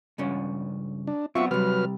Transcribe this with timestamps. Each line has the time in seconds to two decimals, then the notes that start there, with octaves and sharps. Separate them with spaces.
0.18 C#2 G2 C#4
1.07 D4
1.35 F#3 B3 C4 F4 E5 C#6
1.51 C3 F#3 G3 B4 F6